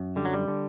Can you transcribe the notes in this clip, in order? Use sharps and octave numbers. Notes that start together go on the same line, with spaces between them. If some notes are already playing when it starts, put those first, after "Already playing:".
Already playing: F#2
D3 G3
F#3
G3
D3